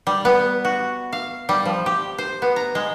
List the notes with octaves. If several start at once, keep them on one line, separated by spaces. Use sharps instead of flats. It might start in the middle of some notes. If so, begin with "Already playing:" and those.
G3
B3
F#4
F5
G3
F3
G4
C5
B3
A#5
G#3